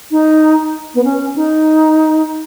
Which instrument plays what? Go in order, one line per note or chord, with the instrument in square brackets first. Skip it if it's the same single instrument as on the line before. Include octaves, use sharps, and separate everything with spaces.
[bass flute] D#4
B3
C#4
D#4